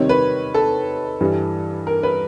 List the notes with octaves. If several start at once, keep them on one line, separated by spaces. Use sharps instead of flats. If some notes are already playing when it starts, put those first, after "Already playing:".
Already playing: C3 D#3 G3 C4 C#5
B4
A4
G2 E3 G3
A#4
B4